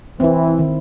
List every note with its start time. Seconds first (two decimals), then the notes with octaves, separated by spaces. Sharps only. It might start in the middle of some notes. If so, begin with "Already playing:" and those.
0.20 E3 C4 E4
0.59 D#3